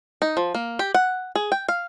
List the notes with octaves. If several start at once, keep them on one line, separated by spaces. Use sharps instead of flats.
D#4
F3
A#3
G4
F#5
G#4
G5
F5